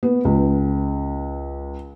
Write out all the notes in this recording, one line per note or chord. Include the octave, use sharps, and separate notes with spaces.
B3
C#2